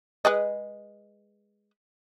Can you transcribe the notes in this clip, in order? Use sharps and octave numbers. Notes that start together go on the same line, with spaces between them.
G#3 B4 D#5